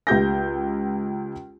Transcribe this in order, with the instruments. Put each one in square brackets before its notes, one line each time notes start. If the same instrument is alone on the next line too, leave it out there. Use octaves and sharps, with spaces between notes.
[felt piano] C#2 G4 G6 A#6